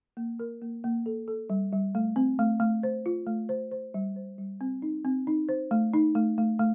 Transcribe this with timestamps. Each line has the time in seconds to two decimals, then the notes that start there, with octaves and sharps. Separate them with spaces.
0.17 A#3
0.39 A#4
0.62 A#3
0.84 A#3
1.06 A4
1.28 A4
1.50 G3
1.73 G3
1.95 A3
2.16 C4
2.39 A3
2.60 A3
2.83 C5
3.06 F4
3.27 A3
3.49 C5
3.71 C5
3.94 G3
4.16 C5
4.38 G3
4.61 C4
4.82 D#4
5.05 C4
5.27 D#4
5.49 C5
5.71 A3
5.94 D#4
6.15 A3
6.38 A3
6.59 A3